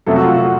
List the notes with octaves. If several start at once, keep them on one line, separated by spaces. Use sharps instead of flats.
F2 C3 F#3 A3 A4
F#4
F4
F#4